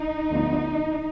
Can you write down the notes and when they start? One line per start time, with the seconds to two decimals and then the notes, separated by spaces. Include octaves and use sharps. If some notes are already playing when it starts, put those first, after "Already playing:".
Already playing: D#4
0.31 D2 D3 F3 B3